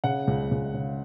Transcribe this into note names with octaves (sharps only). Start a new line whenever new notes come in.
C#3 F#5
C#2
C#2
C#3